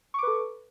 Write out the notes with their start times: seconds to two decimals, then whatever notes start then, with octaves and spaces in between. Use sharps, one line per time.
0.14 C#6
0.18 D6
0.23 B4
0.27 A4